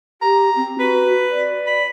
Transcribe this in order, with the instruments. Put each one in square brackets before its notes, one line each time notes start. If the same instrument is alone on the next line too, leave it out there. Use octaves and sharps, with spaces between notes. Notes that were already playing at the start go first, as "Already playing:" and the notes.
[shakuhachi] G4 [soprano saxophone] A#5
[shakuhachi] C4
[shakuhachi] F#4 [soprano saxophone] B4
[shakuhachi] D5
[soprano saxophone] B5